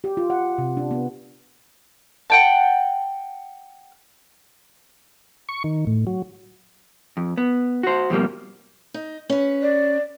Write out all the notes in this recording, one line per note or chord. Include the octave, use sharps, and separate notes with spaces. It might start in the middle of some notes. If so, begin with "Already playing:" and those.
G4
F4
F#5
C3
D4
B3
F#5 G5 A5
C#6
D#3
A2
F#3
F2
B3
F#4 C5
F2 B2 G3 A#3
D#4
C#4 B4
D5